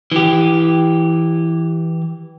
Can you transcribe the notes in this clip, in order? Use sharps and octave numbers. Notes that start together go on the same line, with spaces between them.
E3 G4